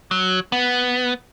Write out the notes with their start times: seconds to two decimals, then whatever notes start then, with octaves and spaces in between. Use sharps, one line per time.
0.11 F#3
0.52 B3